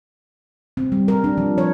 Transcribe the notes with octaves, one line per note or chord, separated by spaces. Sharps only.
C4
G3
A#4
D4
F3
C#5